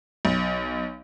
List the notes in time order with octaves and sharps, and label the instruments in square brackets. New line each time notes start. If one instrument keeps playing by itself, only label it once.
[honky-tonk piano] B1